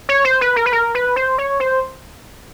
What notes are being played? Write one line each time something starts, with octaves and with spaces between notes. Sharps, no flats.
C#5
C5
B4
A#4
B4
A#4
B4
C5
C#5
C5